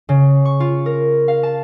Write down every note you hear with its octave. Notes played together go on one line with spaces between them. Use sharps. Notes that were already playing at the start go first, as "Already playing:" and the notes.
C#3
C#6
F4
A#4
F5
A5